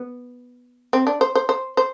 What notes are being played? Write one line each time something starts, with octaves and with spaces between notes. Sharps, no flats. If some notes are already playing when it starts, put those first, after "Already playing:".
Already playing: B3
C4
D4
C5
C5
C5
C5